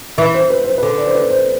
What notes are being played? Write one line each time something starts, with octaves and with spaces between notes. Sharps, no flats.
E3 E5
C5
B4
C5
D3 B4
D5
C5
B4
C5